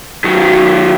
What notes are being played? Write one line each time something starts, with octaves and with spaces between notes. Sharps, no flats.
D#3 F#3